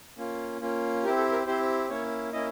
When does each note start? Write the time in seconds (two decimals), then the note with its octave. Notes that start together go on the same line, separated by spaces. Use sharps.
0.17 A#3 C#4 F4
0.61 A#3 C#4 F4
1.03 C4 E4 G4 A#4
1.18 A4
1.32 A#4
1.46 C4 E4 G4 C5
1.89 A#3 C#4 E4 C#5
2.33 A#3 C#4 E4 D#5